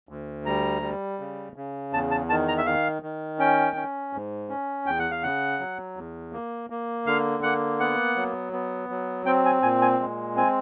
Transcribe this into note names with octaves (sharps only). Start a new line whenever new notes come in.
D2
G3 A#5
G3
C#3
C#3
E2 A5
A5
D#3 A5
A#5
E5
D#3 F5
D#3
C#4 G5
C#4
G#2
C#4
E2 G5
F#5
F5
C#3 F#5
F#3
E2
A#3
A#3
D3 F5
A#3 F#5
B3 F#5
F#3
B3
F#3
C4 G5
G#5
A#2 G#5
G#5
G#3
C4 G#5